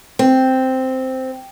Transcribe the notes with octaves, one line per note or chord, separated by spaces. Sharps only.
C4